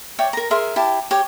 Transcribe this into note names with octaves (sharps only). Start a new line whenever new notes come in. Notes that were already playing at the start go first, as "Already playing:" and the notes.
C#5 D5 E5 G5
A#4 A#5
G#4 A#4 E5 C6
E4 G4 A5
G4 C#5